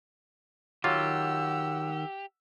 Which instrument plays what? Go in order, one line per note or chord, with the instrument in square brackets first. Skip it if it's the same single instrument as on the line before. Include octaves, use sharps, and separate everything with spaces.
[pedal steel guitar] D#3 D6 [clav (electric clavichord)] F#3 F4 [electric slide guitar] G4 [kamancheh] F#5 E6